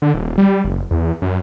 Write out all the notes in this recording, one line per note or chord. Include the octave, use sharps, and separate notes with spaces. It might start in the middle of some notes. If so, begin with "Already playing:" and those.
D3
D#1
G3
F#1
E2
F#2